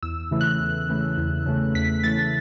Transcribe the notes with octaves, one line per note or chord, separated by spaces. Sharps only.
E2 E6
C#3 E3 A3
F#6
E2
C#3 E3 A3
E2
C#3 E3 A3
E2 B6
C#3 E3 A3 A6